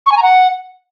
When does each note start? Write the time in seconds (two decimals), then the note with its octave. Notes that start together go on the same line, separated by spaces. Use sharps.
0.06 C#6
0.12 G#5
0.17 A#5
0.22 F#5